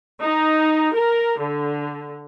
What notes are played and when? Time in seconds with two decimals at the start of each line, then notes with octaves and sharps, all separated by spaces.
0.21 D#4
0.94 A#4
1.38 D3